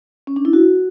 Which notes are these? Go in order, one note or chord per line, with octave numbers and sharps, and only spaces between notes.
C#4
D4
E4
F#4